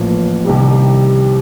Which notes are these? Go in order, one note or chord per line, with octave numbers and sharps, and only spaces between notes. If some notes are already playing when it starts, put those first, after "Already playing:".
Already playing: A1 A2 F3 A#3
C2 C3 D#3 G3